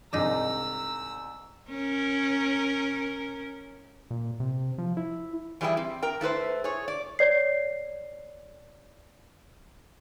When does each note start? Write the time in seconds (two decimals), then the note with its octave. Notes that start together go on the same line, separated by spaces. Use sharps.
0.13 C2 G#2 D4 D#4 A#5 D6 E6
1.69 C#4 A#4
4.11 A#2
4.40 C3
4.78 F3
4.97 E4
5.61 E3 G3 E4 G#4 G5
5.77 C4
6.02 A#4 G5
6.21 A3 E4 B4 C5
6.64 G#4 C#5
6.88 D5
7.19 C#5 D5 C7